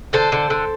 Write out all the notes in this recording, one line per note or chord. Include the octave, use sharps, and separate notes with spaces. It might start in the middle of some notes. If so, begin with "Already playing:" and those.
D3 A4 C5
D3
D3